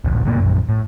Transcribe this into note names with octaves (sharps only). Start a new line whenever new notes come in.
D1 A#1
D2 G2 B2 A#3
A#1 F#2
A2